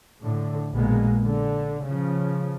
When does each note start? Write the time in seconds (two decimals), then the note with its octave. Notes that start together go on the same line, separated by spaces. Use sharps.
0.20 A2 D3
0.75 A#1 B2 G#3 A#3 B3
1.24 D3
1.85 C#3 F3